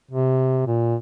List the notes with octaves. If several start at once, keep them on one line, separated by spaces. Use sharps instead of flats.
C3
A#2